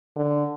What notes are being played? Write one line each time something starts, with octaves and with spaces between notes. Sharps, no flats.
D3